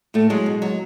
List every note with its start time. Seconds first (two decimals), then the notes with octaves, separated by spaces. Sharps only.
0.14 A2 A3
0.30 F#3 G#3
0.46 B2
0.62 F#3